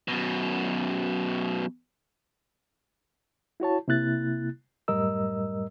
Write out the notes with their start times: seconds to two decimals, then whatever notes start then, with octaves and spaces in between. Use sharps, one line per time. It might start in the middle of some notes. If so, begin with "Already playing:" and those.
0.08 F#2 B2
3.60 E4 F#4 C#5 A5
3.88 C3 A#3 E4 F#6 A6
4.88 F#2 A2 G3 A#4 D#5 E6